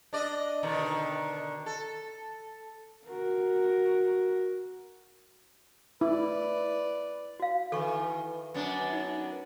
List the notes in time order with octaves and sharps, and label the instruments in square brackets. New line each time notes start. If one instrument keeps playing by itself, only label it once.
[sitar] D4 D5 D#5
B2 D3 D#3
A4
[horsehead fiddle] F#4 A#4
[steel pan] E4 [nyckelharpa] B4 D5
[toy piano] F#4 F5
[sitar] D#3 E3 [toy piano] A4 C#6
[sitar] F#2 B3 D4
[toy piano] D#4